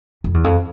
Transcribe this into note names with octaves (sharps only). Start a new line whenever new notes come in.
F2
E2
F2